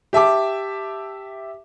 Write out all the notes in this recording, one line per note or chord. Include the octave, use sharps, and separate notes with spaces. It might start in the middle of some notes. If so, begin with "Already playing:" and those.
G4 E5 A5 D6